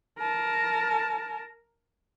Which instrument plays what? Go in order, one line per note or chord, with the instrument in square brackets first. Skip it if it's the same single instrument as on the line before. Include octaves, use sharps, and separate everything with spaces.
[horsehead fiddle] A#4 A5